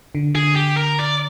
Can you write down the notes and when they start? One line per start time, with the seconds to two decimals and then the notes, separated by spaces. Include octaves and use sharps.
0.15 D3
0.35 D3 G#4
0.56 G4
0.77 A#4
0.99 D5